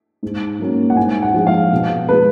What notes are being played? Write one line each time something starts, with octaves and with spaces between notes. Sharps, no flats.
G#2
F#3 A#3 C#4
F#5
G#2 G#5
F#5
F3 G#3
F5
B2
G#3 B3 B4